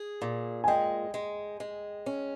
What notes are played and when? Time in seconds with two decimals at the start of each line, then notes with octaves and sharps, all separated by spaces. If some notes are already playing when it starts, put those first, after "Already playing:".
Already playing: G#4
0.22 A#2
0.64 G#5
0.68 G#3 D#5 G5
1.14 G#3
1.60 G#3
2.06 C#4